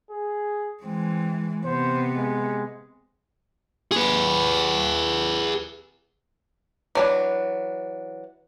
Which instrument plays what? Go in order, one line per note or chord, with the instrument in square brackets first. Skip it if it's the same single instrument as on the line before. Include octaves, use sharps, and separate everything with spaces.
[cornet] G#4
[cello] E3 G#3 [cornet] C4
[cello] C3 B3 [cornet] C5
[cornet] G#3
[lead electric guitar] G#4 B4
[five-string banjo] E3 F#3 D4